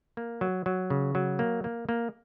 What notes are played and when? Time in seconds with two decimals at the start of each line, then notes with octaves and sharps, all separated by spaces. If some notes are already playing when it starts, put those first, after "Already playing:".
0.17 A#3
0.41 F#3
0.66 F#3
0.90 C#3
1.15 F#3
1.39 A#3
1.64 A#3
1.89 A#3